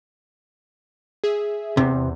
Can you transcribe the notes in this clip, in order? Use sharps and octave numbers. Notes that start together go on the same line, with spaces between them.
G#4 E5
E2 C3